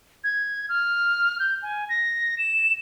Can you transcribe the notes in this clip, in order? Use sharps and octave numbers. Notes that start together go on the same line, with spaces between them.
G#6
F6
G6
G#5
A#6
E7